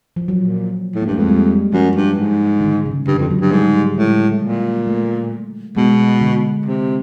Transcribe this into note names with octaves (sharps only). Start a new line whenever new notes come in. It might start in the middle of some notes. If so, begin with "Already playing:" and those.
F3
F#3
A#2
A2
A#3
G2
A3
F2 G#3
G3
F#2 F3
G2
G#2
D3
D#3
C#3
G2 D3
F2
F#3
G2
G#2 G3
A2 G#3
A#2
A3
B2 G#3
D3
C3